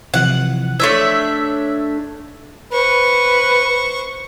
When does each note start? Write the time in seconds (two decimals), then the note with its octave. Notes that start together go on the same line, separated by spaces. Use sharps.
0.14 C3 E3 F3 F#5
0.80 A3 D4 C#5 E5 G#6
2.73 B4 C5 C#6